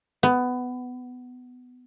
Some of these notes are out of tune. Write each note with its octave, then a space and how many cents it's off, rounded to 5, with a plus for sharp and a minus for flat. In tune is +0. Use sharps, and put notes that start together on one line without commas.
B3 +15